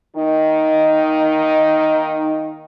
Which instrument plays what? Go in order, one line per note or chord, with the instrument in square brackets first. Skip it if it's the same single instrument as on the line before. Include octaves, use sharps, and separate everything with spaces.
[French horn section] D#3 A#3 D#4